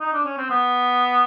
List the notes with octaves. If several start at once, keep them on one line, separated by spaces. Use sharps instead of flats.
D#4
D4
C#4
C4
B3